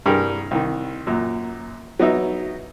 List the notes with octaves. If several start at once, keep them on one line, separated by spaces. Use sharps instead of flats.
C2 G2 D4 G4 G#4 A#4
C2 D#3
F#2 A#2
F#3 B3 D#4 E5